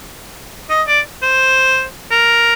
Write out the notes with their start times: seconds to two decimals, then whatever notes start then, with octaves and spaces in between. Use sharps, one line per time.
0.70 D#5
0.88 D5
1.23 C5
2.11 A#4